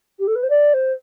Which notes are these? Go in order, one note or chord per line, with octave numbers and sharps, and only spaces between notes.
G4
A4
B4
C5
D5
C5